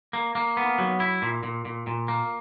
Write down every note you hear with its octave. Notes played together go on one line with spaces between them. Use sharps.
A#3
A#3
B3
F#3
E4
A#2
A#2
A#2
A#2
A#3